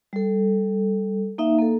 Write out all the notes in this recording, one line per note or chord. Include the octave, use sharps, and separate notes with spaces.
G3 A4
A#3 D#4 E5 F5
A#3 A4